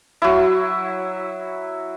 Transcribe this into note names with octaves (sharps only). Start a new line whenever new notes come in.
F#3 E4